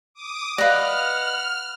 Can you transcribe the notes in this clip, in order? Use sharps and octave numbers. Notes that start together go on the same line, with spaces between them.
D6 D#6
B4 D5 D#5 F5 F#5 F6